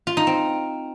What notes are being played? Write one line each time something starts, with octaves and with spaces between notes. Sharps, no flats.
F4
D#4
C4